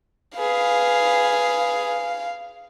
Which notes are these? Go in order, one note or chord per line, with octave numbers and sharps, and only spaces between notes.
G#4 B4 F5